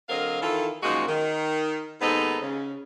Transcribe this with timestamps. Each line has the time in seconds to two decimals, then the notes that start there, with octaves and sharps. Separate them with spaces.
0.09 D3 F#3 C4 A#4 D#5 F5
0.42 D#3 E3 F4 A4
0.83 F#2 A#2 F3 G#3 D#4 F#4
1.08 D#3
2.01 D#2 G#2 B3 D#4 A4 C5
2.41 C#3